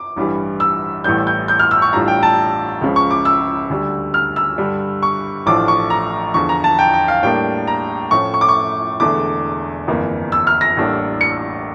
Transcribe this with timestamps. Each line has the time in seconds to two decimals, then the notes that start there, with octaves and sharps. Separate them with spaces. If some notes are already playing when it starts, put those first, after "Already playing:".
Already playing: D6
0.16 A1 G2 E3 G3
0.60 E6
1.04 A1 A2 E3 G3 G6
1.27 G6
1.48 G6
1.59 F6
1.71 E6
1.82 C#6
1.93 A1 A2 G3 D4 F4 A#5
2.08 G5
2.23 A5
2.81 C#2 C#3 F3
2.96 C#6
3.11 D6
3.25 E6
3.70 D2 D3 G3
4.14 F6
4.36 E6
4.58 G2 D3 G3
5.03 C#6
5.46 A1 A2 F3 A3 D4 D6
5.68 C#6
5.90 A#5
6.34 E2 D3 F3 C#6
6.49 A#5
6.64 A5
6.79 G5
6.93 G5
7.08 F5
7.23 A2 G3 A#3 D4 G5
7.67 A#5
8.11 A2 F3 A3 C#4 E4 C#6
8.34 C#6
8.41 D6
8.49 C#6
9.00 E1 E2 D3 A3 D4 D6
9.88 G1 F2 E3 A#3
10.32 E6
10.47 F6
10.61 A#6
10.77 A1 A2 G3 A#3 D4
11.21 C#7